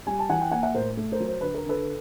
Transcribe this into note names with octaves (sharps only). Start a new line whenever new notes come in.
G3 G#5
A5
E3 F#5 G#5
G5
A#3 F#5 G#5
E5 F#5
A2 A#4 C5
A3
A#4 C5
F#3
C5
D3 B4
A#4
D3 A4 B4